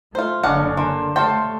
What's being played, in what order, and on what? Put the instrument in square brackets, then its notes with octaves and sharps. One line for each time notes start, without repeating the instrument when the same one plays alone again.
[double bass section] A3 [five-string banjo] F4 C5
[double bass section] F#1 D3 [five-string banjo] G#3 F5 F#5 [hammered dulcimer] C#4 D4
[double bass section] D3 [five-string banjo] A#3 [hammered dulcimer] C5
[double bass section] A3 [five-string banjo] C5 F5 G5 [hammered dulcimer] C#5 A5 C6